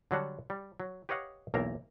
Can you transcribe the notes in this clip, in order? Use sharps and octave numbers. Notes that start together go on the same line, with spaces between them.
D3 F#3 G3 F#5 A5
G3
F#3
G4 B4 C#5 D#5 F5 F#5
B1 E2 A#3 A#4 E5 A#5